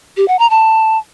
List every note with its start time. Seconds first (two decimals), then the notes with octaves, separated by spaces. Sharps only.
0.17 G4
0.28 F#5
0.39 A#5
0.50 A5